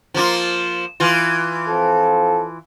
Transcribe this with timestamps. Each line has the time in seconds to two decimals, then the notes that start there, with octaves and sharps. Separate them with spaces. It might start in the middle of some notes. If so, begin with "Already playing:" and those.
0.14 F3 A#3 F4
1.00 E3 F4
1.69 F3 C4 A4